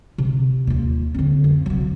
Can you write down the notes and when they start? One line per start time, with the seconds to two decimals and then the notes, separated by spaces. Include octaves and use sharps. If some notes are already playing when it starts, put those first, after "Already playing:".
0.18 C3
0.67 D#2 F4
1.14 D3 C4
1.44 F2
1.66 C3 F#3